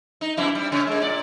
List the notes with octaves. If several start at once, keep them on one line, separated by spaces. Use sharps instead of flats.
D#4
F#2 C3 E4
G3
C#3 C#4
G#3 A#3
A#2 D5